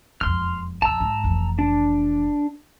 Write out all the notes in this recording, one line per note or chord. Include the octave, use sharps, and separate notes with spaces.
E1 F2 C6 F6
F2 B2 A5 A#5 E6
G#2
F1 E3
D4